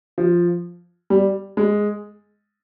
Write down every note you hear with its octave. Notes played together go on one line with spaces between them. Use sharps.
F3
G3
G#3